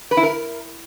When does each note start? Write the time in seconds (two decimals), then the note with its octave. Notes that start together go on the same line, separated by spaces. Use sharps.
0.11 B4
0.17 E4
0.23 A#4